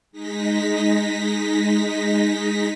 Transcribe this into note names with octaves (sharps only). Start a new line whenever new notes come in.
G#3 D#4 A#6 B6